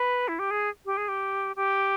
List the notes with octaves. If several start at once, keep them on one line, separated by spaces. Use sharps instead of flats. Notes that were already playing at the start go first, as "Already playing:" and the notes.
Already playing: B4
E4
G4
G#4
G4
G#4
G4
G4